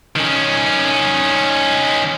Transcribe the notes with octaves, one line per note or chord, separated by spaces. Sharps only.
D#3 C#4